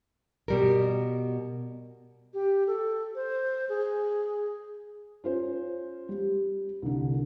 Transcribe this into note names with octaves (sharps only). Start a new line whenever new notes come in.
B2 G3 A#4
G4
A4
C5
G#4
C#4 F4 C5
G3
C2 D3